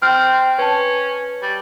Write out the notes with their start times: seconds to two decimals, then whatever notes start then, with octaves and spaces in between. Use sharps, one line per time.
0.02 C4 G5 F6
0.58 C#4 B4 A5
1.42 G3